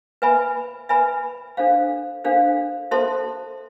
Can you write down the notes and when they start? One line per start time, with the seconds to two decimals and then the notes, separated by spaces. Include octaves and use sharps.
0.22 B4 E5 G#5 B5
0.89 B4 E5 G#5 B5
1.57 D4 A4 C5 F5
2.24 D4 A4 C5 F5
2.91 A4 C5 E5 A5 C6